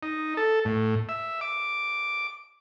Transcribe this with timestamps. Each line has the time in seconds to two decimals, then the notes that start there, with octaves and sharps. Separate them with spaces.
0.03 D#4
0.37 A4
0.65 A2
1.09 E5
1.41 D6